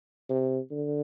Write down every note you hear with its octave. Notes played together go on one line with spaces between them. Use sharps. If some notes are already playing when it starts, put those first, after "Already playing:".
C3
D3